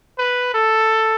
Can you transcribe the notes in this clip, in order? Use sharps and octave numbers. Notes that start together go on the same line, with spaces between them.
B4
A4